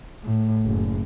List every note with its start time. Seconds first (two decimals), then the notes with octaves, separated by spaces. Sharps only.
0.24 A2
0.65 F#1